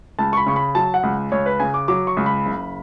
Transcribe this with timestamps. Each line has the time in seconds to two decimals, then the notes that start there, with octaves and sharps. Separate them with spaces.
0.19 C#2 A5
0.33 C#6
0.37 B5
0.46 C#3 C#6
0.56 B5
0.75 F#3 A5
0.94 F#5
1.03 C#2
1.32 C#2 C#5
1.46 B4
1.60 C#3 G#5
1.74 D6
1.88 F#3 D6
2.07 C#6
2.17 C#2
2.26 B5
2.45 F#1